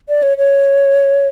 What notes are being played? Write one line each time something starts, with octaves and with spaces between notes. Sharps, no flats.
D5
C#5
C#5